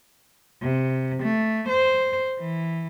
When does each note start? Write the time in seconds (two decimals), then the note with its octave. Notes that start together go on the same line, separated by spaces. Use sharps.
0.60 C3
1.21 A3
1.67 C5
2.38 E3